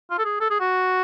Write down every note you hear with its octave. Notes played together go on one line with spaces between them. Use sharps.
F4
A4
G#4
A4
G#4
F#4